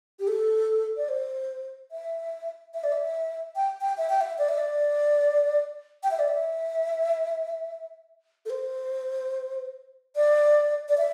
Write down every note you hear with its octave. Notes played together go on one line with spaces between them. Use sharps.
G4
A4
D5
C5
E5
E5
D5
E5
G5
G5
E5
G5
E5
D5
E5
D5
G5
E5
D5
E5
A4
C5
D5
D5
E5